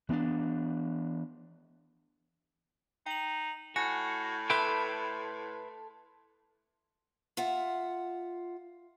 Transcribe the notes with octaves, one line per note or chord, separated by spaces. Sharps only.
E3 B3 C4 D4
D#4 G5 F#7
A2 F#4 G#5
A4 B4 E5 G5 A5 C6
F4 E5 F#5